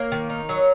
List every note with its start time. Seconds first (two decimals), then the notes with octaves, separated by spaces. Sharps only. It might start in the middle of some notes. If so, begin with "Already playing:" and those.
Already playing: A#3 A#4 C#5
0.12 D#3
0.30 D#4
0.49 F#3